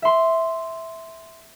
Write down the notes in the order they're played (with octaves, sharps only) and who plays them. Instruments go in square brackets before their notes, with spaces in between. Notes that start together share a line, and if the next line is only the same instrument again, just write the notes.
[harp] E5 C6